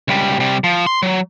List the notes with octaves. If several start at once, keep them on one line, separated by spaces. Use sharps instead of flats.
C#2 G3
C3 G3
F3
C6
F#3